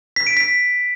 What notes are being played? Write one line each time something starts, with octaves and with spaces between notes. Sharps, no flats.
B6
D7
B6